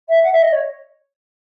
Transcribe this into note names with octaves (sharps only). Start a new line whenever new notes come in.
E5
F#5
E5
D#5
C#5